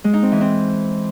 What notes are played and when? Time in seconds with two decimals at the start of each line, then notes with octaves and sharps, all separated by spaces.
0.04 G#3
0.14 D#4
0.23 C4
0.32 E3
0.41 C4